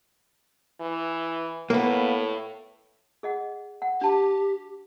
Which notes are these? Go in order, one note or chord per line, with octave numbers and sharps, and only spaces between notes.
E3
A2 A#3 B3
G#4 D#5 F#5
F#5
D4 G4 A5